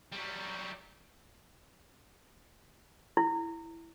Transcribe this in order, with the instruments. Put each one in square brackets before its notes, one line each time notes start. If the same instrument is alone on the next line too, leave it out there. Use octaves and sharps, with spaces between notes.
[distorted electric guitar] F#3 G3
[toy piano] E4